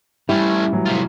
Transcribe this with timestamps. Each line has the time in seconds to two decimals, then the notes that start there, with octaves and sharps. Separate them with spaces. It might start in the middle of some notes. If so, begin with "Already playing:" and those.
0.29 G3 A3 C#4 E4
0.72 A2 E3 F#3
0.86 C3 F4